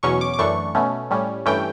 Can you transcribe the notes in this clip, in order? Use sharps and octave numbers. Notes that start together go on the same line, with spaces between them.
E2 B2 F#3 C#4 C#6
D6
D6
F#2 E3 A3 D4 C#6
B2 A3 C#4
A2 G3 C#4
G2 E3 A3 C#4 G5